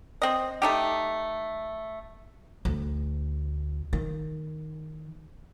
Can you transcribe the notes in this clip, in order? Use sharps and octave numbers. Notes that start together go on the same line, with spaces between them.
C4 D#5
A3 D#4 G4
D2
D#3